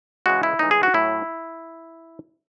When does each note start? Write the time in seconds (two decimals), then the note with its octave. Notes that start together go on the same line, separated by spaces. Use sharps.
0.26 C#3 E3 G#3 F#4
0.43 E4
0.59 A2 E3 G#3 D#4
0.71 G#4
0.83 F#4
0.94 A2 F#3 E4